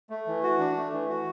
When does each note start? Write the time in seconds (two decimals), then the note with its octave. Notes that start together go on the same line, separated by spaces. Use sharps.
0.10 A3
0.27 E3
0.43 F#4
0.59 D4
0.77 A3
0.92 E3
1.09 F#4